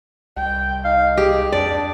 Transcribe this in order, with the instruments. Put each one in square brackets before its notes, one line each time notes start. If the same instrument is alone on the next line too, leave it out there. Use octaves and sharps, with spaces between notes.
[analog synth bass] C2 [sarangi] G5
[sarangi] D#4 [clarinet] F5
[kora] G4 [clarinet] G#4
[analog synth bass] F2 [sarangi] D4 [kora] D5